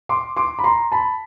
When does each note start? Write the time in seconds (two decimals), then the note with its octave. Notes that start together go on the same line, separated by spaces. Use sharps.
0.09 C6 D6
0.36 C6 D6
0.59 B5
0.64 A#5 C6
0.92 A5 B5